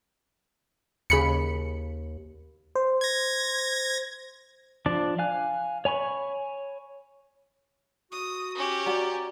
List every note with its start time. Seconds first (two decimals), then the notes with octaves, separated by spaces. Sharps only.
1.10 D#2 C#3 B5 C#7
2.75 C5
3.01 G#6 A#6
4.86 F3 D4 D5 A5
5.19 F5 G#5 F#6
5.85 C#5 G#5 B5 C#6
8.11 F#4 D#6
8.55 C#4 G4
8.86 F#4 D5 A#5